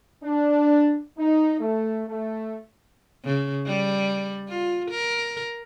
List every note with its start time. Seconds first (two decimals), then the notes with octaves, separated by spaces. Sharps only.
0.23 D4
1.18 D#4
1.59 A3
2.07 A3
3.25 C#3
3.67 G3
4.49 F4
4.91 A#4